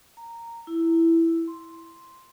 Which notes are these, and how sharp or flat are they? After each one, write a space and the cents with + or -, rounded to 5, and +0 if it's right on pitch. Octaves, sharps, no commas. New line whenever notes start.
A#5 -10
E4 +5
C6 +0